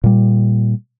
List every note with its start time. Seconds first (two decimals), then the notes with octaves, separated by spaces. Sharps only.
0.04 A#2 G3